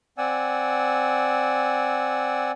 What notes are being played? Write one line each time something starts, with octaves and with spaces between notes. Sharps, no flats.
C4 D5 F#5 G#5 E6